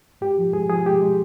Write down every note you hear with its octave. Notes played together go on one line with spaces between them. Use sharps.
G#2 G4
F3
G#2 G#4
F3 G#4
G#3 G4
G#3